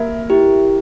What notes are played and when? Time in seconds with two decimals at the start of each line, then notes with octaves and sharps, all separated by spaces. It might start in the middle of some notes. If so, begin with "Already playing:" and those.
Already playing: A#3 A#4 E5
0.30 E4 G4